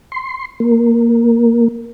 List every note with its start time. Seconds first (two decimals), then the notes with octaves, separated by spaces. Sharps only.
0.12 C6
0.60 A#3